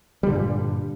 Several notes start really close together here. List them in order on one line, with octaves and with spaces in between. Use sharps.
G3 D3 G2 A#2